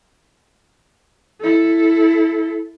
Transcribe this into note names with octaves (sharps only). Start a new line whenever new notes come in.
E4 A4